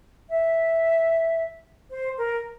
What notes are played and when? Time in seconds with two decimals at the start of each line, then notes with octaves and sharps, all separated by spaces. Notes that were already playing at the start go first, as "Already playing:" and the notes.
0.30 E5
1.90 C5
2.18 A#4